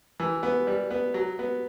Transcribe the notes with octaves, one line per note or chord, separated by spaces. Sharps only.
E3
B3
G3
B3
F#3
B3